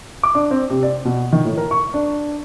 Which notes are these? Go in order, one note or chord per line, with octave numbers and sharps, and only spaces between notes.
D6
D4
C4
C3
D5
B2
D#3
A2
A#4
C#6
D4